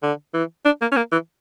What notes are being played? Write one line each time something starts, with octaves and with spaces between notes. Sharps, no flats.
D3
E3
D4
A#3
C#4
A#3
E3